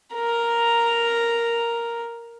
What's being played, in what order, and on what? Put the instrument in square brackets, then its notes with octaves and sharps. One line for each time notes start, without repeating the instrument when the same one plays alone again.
[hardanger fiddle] A#4 A#5